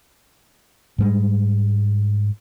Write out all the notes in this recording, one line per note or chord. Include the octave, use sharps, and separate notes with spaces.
G#2 G3 G#3